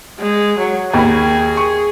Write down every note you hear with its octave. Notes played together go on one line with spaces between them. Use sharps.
G#3
F#3
D#2 G#4 B5
C#6